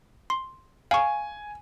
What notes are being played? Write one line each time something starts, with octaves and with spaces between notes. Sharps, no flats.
C6
F5 G#5 C#6